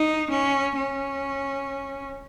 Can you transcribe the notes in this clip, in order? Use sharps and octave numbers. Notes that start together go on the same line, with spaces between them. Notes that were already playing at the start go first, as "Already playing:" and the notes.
Already playing: D#4
C#4
C#4